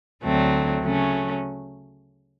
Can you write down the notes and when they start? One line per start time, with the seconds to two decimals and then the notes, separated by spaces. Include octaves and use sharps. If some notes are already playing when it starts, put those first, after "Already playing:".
0.23 D2 D3 F#3 A3 C4
0.82 C#3 F#3 A3 C#4